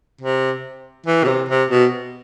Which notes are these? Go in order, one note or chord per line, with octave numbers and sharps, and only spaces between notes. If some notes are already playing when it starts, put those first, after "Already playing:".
C3
E3
B2
C3
C3
B2